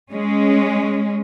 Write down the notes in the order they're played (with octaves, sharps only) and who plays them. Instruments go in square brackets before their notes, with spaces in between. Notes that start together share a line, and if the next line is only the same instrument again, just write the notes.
[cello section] G#3 C#4